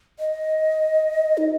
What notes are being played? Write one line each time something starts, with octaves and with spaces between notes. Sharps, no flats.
D#5
D#4